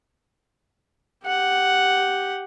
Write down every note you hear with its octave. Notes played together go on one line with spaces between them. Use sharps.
G4 F#5